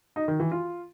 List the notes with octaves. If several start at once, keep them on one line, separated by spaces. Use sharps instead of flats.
D#4
D#3
E3
F4